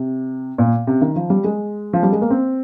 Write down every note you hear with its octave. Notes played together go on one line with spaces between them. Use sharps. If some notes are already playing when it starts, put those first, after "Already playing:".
Already playing: C3
A#2
C3
D#3
F3
G3
G#3
F3
G3
G#3
A#3
C4